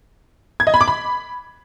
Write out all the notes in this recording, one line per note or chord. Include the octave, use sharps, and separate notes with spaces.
G#6
D#5
B5
D6
B5